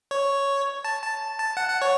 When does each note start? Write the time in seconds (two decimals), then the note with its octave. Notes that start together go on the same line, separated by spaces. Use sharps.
0.11 C#5
0.84 A5
1.03 A5
1.39 A5
1.57 F#5
1.69 F#5
1.82 C#5